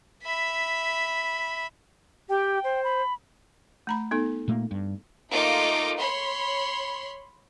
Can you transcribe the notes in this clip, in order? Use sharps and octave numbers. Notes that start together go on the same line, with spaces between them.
E5 B5
G4 G5
C5
B5
A3 A#5 B5
B3 D#4 A4
A#2 A3 A#3
G2
A3 A#3 D#4 F4 D6
C#5 B5 C6